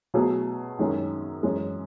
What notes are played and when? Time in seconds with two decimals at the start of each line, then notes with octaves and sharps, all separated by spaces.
0.14 B2 F#3 A3 E4 G#4
0.79 F#2 D#3 G#3 C#4 G#4
1.43 F#2 E3 G#3 C#4 G#4